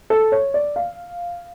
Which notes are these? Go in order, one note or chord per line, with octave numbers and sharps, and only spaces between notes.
A4
C#5
D5
F5